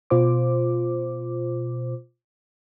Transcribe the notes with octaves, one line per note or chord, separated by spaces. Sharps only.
B2 F4 C5 D6